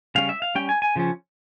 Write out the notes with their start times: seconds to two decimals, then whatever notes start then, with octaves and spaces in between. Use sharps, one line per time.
0.15 C#3 G3 C#4 F5
0.29 E5
0.42 F5
0.55 G3 C#4 G5
0.69 G#5
0.82 G#5
0.96 C#3 F3 C#4